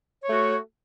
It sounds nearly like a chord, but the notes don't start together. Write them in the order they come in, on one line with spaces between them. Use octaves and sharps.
C#5 A3 F#4